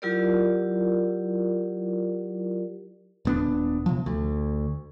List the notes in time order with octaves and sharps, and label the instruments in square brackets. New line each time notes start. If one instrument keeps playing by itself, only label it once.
[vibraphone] F#3 E4 F4 G4 A#4 D5
[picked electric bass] D#1 B3 D4
C3 F3
D2